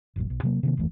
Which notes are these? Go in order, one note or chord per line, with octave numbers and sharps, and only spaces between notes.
F1 A#1 F#2
B1
C3 F#3 A#3
C3 D#3 A#3
F#1 D#2 E3 A3